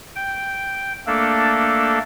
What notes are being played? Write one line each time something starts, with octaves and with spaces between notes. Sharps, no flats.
G5
A3 A#3 D4 A4